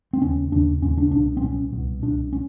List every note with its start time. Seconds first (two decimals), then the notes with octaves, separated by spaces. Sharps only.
0.13 C4
0.21 D#2 C#3 C#4
0.52 D#2 C#3 D4
0.82 D#2 C#3 C#4
0.97 D4
1.11 C2 B2 D4
1.37 C4
1.42 C2 B2 C#4
1.72 C2 B2
2.02 C2 B2 D4
2.33 C#4